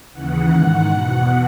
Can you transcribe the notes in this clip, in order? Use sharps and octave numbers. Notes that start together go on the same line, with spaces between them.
D#2 C#3 E3 F#5
G#2 D#3 F#5
E2 B2